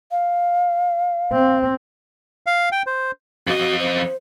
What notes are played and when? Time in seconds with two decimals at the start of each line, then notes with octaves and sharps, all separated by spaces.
0.11 F5
1.32 C4
2.46 F5
2.72 G5
2.87 C5
3.47 F2 F#4 D#5
3.79 C5